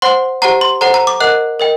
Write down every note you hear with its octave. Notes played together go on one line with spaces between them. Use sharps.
C5 F#5 C6
G4 C5 F#5 A#5
C6
A4 C5 F#5 A#5
A#5
D6
A#4 D#5 F#5 F#6
A#4 D#5 G5